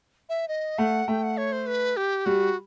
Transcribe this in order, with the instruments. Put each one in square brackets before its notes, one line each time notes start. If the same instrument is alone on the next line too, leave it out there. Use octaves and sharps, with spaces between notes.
[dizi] E5
D#5
[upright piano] A3 [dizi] F#5
[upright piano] A3 [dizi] G5
[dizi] F#5
C#5
C5
B4
G4
[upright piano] G3 [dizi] F#4